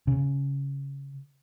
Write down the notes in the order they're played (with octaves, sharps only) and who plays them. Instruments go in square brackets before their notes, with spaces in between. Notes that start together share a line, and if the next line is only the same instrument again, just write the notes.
[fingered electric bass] C#3